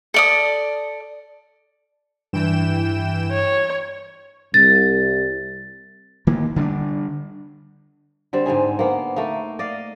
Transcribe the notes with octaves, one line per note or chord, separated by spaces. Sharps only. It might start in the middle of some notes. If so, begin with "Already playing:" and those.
A4 D5 D#6
G2 E3 G5 E7
C#5
C2 A6
D#3 A#3
D3 G3 C4 D4
D3 G3 C4
G#2 D3 D#4 G#4
A#3 B3
A3 A#3 D#4
D5 D#5 F5